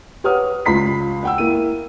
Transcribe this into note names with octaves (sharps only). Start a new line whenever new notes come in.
G4 B4 C#5 F#5 D#6 F6
C#2 F4 B5 B6 C7
F#5 G5 E6
A#3 E4 D#7